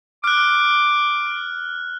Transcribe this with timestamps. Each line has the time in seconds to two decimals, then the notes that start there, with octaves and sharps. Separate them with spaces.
0.24 D6 F6 F#6